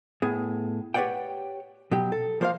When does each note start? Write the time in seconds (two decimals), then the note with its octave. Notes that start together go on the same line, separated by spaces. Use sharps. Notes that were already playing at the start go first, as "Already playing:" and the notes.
0.22 A2 B3 G#4
0.94 G4 B4 C#5 D5 F#5 G5
1.91 B2 F#3 G4
2.12 A4
2.41 F3 A#3 C5 C#5 F5